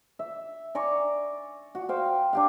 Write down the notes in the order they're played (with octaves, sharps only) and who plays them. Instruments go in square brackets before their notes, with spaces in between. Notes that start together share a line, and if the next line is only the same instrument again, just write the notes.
[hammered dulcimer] E5
D5 G#5 A#5 C#6
F#4
C5 F5 G5
D4 G4 F5